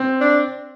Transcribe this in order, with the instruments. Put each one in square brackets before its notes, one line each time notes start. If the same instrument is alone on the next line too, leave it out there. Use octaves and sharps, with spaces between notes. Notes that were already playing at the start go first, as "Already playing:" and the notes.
Already playing: [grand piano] C4
[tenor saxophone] D4